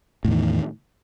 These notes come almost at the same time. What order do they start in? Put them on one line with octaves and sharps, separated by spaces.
A2 E2 D#3